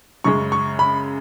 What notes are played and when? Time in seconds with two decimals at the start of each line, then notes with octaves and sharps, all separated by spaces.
0.24 F#2 C#3 G#3 C#6
0.52 C#6
0.79 B5